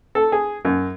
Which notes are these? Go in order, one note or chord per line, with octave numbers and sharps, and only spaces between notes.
A4
G#4
F#2